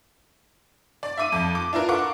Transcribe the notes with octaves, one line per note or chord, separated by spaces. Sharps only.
D5
E5 F5 D6 D#7
F2
D6
D4 E4 F4 A#4 B4
A4 A#4 F5 F#5 C#6 D6